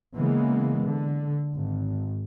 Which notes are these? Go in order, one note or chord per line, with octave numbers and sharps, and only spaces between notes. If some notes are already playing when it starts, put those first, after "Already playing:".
C#3 E3 G#3 A#3 B3
D3
G#1